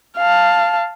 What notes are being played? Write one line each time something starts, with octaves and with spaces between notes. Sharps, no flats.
F5 A5